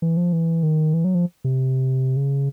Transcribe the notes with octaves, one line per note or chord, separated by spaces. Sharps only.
E3
F3
E3
D#3
E3
F#3
F3
C3
C#3